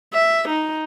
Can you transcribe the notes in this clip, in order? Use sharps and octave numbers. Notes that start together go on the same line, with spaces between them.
E5
D#4